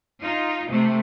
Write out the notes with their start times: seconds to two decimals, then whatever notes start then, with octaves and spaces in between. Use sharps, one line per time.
0.22 D#4 F4
0.69 C3 A3